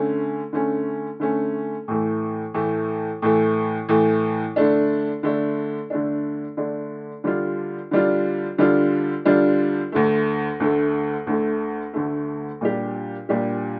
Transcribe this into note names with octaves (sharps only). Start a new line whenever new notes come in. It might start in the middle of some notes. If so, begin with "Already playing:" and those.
Already playing: D3 A3 C#4
D3 A3 C#4
D3 A3 C#4
A2 E3 A3
A2 E3 A3
A2 E3 A3
A2 E3 A3
D3 A3 D4
D3 A3 D4
D3 A3 D4
D3 A3 D4
D3 G3 D4 F4
D3 G3 D4 F4
D3 G3 D4 F4
D3 G3 D4 F4
D2 D3 A3
D2 D3 A3
D2 D3 A3
D2 D3 A3
A#2 G3 D4 G4
A#2 G3 D4 G4